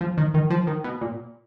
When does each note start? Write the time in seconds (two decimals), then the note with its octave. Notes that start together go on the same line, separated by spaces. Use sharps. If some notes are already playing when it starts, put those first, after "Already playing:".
0.01 F3
0.18 D#3
0.34 D#3
0.50 F3
0.67 D#3
0.84 B2
1.01 A#2